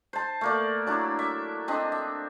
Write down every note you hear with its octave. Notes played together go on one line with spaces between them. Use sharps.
C5 A5
A3 A#3 D5
F#3 D4 E4
E5
C4 D4 D#5
E5